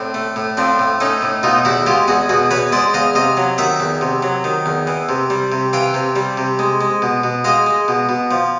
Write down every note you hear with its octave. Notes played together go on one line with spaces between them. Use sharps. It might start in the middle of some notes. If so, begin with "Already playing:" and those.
Already playing: A2 C4 D4
A3
A2
F3 C4 D4
A2
A3 C#4 D#4
A2
B2 D#4 F4
E2 E4 F#4
G#3 F4 G4
E2 F#4 G#4
B2 F#4 G#4
E2 B4 C#5
G#3 C5 D5
E2 D#5 F5
C3 D#5 F5
F#3
D#3 E5 F#5
E2
C3
F#3
D#3
E2
E3
C3
G3
C3
E3 F5 G5
C3
G3
C3
G#3
G#3
B2
B2
G#3 D#5 F5
G#3
B2
B2
F3